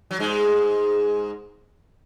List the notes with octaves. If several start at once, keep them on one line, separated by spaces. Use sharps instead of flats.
F#3
G#2 G#3